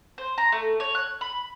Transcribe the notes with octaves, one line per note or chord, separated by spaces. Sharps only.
C5
A#5
A3
C#5
F#6
B5